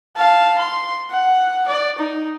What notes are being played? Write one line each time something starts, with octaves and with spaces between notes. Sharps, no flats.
F5 A5
C6
F#5
D5
D#4